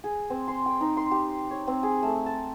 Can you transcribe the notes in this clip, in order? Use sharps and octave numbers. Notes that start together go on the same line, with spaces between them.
G#4
C4
C6
G5
D#4
C6
G4
C#5
C4
G#4
A3
A5